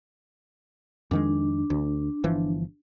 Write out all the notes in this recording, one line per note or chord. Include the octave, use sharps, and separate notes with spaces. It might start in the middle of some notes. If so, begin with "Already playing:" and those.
F2 D#3 G#3 D4
D2
G1 E3 F3